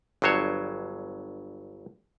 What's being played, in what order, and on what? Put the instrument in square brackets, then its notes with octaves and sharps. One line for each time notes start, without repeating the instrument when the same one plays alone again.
[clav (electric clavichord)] G1 G2 F#3 C5 C#5